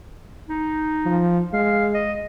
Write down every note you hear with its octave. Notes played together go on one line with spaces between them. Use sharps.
D#4
F3
G#3 F5
D#5